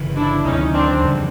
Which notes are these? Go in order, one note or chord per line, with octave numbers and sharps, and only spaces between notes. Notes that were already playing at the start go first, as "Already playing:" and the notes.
Already playing: G1 C#3 E3
D4 E4
D2 C3 D#3 F#3 C#4 D#4
C4 D4
F2 C#3 E3 G3